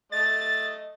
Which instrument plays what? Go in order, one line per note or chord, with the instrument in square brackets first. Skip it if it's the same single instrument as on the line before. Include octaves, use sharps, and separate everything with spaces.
[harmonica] A3 D#5 [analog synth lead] A6